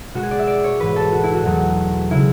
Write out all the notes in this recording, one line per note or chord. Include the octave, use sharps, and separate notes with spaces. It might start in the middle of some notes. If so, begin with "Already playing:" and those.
B2 G#3 F#4
G#4
D5
E5
D5
C#5
G#2 E3 G#3 B4
A4
F#4
E4
F#4
E2 B2 F#3 A3
C#3 G#3 E4